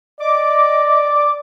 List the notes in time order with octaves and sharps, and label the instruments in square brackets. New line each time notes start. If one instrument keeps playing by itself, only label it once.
[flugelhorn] D5 [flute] D#5 [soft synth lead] D6